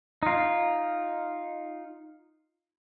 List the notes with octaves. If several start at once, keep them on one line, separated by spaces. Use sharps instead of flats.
D#4 F4